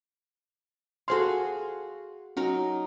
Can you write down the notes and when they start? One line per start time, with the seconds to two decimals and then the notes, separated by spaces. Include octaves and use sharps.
1.08 F#4 G#4 A4 C5 F5 C6
2.37 F#3 C#4 D#4 A#4